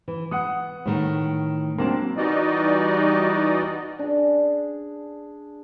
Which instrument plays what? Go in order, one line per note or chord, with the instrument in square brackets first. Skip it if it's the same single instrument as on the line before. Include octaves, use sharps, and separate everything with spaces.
[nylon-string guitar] E3
[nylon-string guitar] B3 [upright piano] F#5 D#6
[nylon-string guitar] A2 D#3 A3
[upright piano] F#3 A#3 [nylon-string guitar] C4 D4 A5
[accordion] E3 G3 D#4 F#4 D5 D#5
[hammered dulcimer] D4 G#4